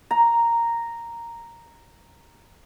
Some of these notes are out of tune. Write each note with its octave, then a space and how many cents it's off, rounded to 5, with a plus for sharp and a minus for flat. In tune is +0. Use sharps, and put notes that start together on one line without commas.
A#5 -5